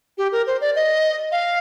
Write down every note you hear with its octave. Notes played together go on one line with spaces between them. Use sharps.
G4
A#4
C5
D5
D#5
F5